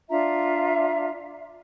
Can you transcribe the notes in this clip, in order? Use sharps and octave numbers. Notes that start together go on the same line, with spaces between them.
D4 F4 E5 A#5